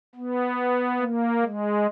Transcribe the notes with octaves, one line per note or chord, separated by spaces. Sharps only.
B3
A#3
G#3